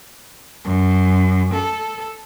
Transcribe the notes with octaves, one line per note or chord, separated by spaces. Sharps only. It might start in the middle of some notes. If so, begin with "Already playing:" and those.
F#2
A4